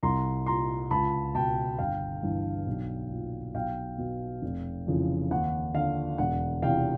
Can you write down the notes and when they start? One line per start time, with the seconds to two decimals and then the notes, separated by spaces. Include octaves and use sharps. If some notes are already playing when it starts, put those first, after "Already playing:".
0.03 C2 A#5 C6
0.46 A#2 A#5 C6
0.91 C#2 A5 B5
1.35 B2 G5 A5
1.78 G1 F5 G5
2.23 G2 E3
2.67 B1
3.11 A#2
3.55 B1 F5 G5
3.98 B2
4.42 F1
4.87 F2 C#3 E3
5.31 D#2 F#5
5.74 D3 F5
6.18 E1 F#5
6.62 E2 C3 F5 G5